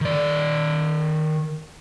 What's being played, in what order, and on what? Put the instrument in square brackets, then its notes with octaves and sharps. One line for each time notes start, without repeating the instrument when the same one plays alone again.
[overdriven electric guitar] D#3 D5